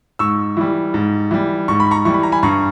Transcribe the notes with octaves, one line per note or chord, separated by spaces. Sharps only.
G#2 C#6 E6
E3 G3
G#2
E3 G3
G#2 C#6
B5
A#5 C#6
E3 G3 C#6
B5
A#5
G#5 B5
G2 A#5 C#6